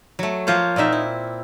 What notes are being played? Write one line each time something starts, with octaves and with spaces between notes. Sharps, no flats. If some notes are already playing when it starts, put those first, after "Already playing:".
F#3 A3
F3 A#3 F4 C5 C#5
A#2 C4 D#4 E5
E4